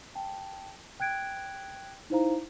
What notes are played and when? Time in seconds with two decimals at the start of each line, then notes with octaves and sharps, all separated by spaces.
0.15 G5 A5
1.00 G5 F#6 G#6 D7
2.10 D#4 E4 C5 F5 A#5